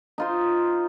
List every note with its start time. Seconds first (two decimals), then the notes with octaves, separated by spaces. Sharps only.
0.18 D#4 F4 C5